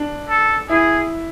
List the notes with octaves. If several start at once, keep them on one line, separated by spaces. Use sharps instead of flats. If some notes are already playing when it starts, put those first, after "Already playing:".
Already playing: D4
A4
E4 G#4